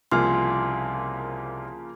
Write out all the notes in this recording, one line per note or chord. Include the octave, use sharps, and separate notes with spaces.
C2 C#3 F3 A#3 F4 G#5 C6 F6